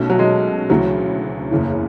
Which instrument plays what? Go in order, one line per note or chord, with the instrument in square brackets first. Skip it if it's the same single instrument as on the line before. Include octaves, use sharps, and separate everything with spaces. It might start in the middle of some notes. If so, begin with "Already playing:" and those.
Already playing: [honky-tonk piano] B1 B2 A3 C#4
[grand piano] F#3
G#3
[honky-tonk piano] D2 C#3 E3 [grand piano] F#3
[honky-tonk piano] F#1 E2 C#3 E3